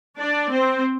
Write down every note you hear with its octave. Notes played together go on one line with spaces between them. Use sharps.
D4 D5
C4 C5